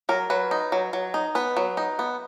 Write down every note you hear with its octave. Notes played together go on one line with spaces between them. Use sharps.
F#3 A#4
F#3 B4
D#4
F#3
F#3
D#4
B3 B4
F#3
D#4
B3